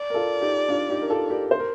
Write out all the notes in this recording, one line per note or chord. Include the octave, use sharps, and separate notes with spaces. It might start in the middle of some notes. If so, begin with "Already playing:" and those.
Already playing: D5
A#4
F4 A4
D#4 G4
D4 F4
D#4 G4
A#4
F4 A4
G4 A#4
C5
A#4